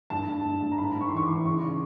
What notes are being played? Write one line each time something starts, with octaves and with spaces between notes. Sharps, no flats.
G2 A5
G2
G2
G2
A#5
G#2 B5
G#2
C#6
C6
E3 C#6
D6
E3
C#3 C#6
C#3